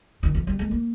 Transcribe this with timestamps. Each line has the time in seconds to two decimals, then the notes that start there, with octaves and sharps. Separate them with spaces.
0.23 D#3
0.35 E3
0.47 G3
0.59 G#3
0.71 A#3